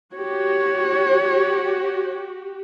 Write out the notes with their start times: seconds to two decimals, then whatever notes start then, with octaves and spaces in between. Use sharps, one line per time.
0.16 F#4 G4 C#5